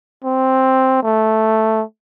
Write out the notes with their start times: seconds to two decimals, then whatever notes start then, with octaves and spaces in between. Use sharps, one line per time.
0.24 C4
1.03 A3